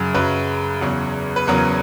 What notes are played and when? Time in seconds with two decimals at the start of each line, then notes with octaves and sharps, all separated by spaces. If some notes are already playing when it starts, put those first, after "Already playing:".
Already playing: F#2 C#3 F#3
0.14 F#2 C#3 F#3 B4
0.81 E2 C#3 F#3
1.36 B4
1.47 E2 C#3 F#3 A#4